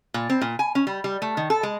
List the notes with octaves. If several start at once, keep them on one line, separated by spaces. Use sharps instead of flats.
A#2
C4
A#2
G#5
C#4
G3
G3
A3
D#3
A4
G#3